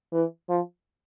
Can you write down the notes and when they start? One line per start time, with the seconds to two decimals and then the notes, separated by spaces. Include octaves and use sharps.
0.13 E3
0.49 F3